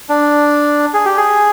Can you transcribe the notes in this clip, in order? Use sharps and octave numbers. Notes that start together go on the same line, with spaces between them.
D4
G#4
G4
G#4